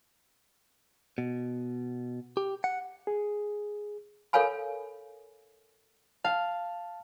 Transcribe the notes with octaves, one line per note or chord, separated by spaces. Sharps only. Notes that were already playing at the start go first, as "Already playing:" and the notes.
B2
G4
F#5
G#4
A4 A#4 C#5 F5 G#5 B5
F5 A5